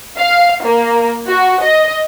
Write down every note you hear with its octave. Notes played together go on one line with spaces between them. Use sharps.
F5
A#3
F#4
D#5